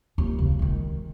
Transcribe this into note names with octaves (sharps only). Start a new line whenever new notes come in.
D#2
C#3
D#3 G#3